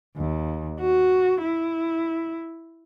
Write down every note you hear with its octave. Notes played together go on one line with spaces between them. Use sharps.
D#2
F#4
E4